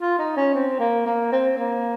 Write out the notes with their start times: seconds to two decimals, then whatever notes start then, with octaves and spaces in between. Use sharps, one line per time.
0.01 F4
0.19 D#4
0.37 C#4
0.54 C4
0.80 A#3
1.06 A#3
1.32 C4
1.58 A#3